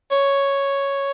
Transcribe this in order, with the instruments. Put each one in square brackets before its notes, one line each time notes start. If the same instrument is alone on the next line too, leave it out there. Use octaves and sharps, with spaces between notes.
[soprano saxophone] C#5